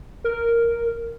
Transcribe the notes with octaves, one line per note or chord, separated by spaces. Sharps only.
A#4